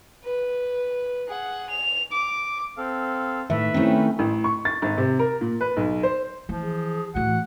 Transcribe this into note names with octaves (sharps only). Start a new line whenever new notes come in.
B4
G#4 F#5
F7
D6
C4 A4 F5
A2 D#3 B4 E5
D#3 A3 C4 C#4 E4
A1
C#6
A6
G#1
C3
A#4
A#2
B4
B1
C5
E3 F3
G#4
A2 E3 F#4 F#5